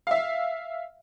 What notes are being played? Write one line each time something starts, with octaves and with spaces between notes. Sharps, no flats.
E5 F5